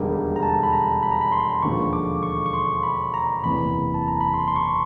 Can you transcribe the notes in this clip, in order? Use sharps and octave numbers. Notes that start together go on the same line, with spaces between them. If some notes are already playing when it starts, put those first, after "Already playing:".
Already playing: E1 D#2 D3 G3 A#3
A#5
A5
B5
A#5
B5
A#5
B5
C6
E1 D#2 D3 F3 C#6
D6
C#6
C#6
C6
B5
A#5
F#1 E2 C3 B5
A5
A#5
B5
C6
C6
C#6